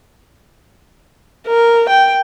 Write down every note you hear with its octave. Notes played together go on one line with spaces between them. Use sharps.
A#4
G5